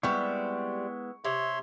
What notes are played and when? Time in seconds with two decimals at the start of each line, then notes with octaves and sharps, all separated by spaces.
0.03 G3 G#3 B3 C4 E4 C#6
1.25 C3 C#5 E5 C6